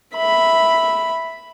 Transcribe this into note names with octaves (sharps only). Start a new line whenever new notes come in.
E5 B5